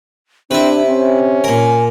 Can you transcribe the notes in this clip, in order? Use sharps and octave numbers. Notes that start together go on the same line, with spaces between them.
C3 C4 D4 E4 B4
C4 C#4
A#2 A#4 G#5